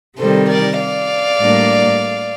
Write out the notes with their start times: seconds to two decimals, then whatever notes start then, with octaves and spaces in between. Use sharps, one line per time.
0.17 C3 D#3 G3 A4 C5
0.47 A#4 D5
0.78 D5 F5
1.39 A2 G3 A#3 D4